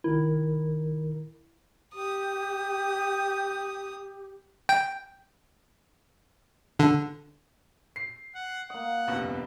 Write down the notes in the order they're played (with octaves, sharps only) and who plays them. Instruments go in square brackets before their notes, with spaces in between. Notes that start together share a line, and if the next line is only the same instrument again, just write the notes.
[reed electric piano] C2 D#3 A#4 [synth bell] E4
[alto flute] G4 [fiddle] D#6
[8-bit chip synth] G5
D3
[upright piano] C7
[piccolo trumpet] F#5
[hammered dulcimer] A#3 D#5 [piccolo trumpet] F#5
[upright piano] G1 C2 F2 [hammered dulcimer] B3